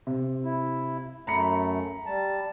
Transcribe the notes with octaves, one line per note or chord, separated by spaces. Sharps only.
C3
E4
F#2 A3 A#5 B5 C#7
G3 A5